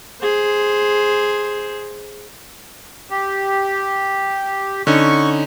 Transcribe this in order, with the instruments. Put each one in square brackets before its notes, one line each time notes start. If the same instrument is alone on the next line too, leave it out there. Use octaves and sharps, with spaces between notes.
[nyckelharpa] G#4 C5
[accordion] G4
[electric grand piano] D3 C#4 D#4 [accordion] C#6